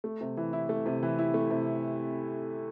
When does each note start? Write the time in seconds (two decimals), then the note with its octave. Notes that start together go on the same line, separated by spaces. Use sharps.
0.04 A3
0.21 C3
0.37 E3
0.53 E4
0.69 A3
0.86 C3
1.03 E3
1.19 E4
1.34 A3
1.50 C3